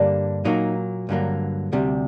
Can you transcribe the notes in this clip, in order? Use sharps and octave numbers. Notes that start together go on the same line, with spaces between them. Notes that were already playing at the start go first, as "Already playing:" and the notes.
Already playing: G2 D3 G3 A#3 D4
A#2 F#3 A#3 D#4
G2 D3 F#3 A#3
D2 C3 G3